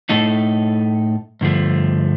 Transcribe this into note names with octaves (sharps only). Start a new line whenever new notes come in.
A2 A3 D#4 A4
G2 D3 F3 A3